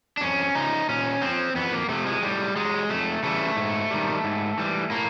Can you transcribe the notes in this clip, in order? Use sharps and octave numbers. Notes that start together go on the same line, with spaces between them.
D4
F2 C#4
C#3 F3 D#4
A#2 C#4
F3 C4
F2 B3
A#3
C3 F3 A3
G#3
A2 G3
F#3 G#3
F2 A3
C#3 E3 G3 A3
G#2
D#3 G3
G#2
E3 G3
A2 A#3